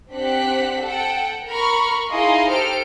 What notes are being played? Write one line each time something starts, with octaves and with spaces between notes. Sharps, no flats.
C4 D4 G4 F#5 F#6 B6
A4 F#5 G5
A#4 A#5 B5 C#6 F6
D#4 E4 G#4 D#5 F5 C6
G4 A4 C5 F6 D7